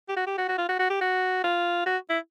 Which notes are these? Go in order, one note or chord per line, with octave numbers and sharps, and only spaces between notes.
G4
F#4
G4
F#4
F#4
F4
F#4
F#4
G4
F#4
F4
F#4
E4